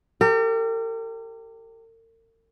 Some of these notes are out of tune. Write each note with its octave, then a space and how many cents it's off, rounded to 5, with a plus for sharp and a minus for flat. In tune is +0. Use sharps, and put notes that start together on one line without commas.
G4 +0 A#4 -45